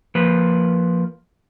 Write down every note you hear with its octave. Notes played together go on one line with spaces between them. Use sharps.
F3 A#3 B4